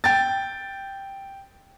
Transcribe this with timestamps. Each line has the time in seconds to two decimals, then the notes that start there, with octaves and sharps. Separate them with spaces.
0.04 G5 A6